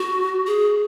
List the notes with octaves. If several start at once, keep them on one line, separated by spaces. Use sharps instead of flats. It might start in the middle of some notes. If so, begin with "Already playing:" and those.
Already playing: F#4
G#4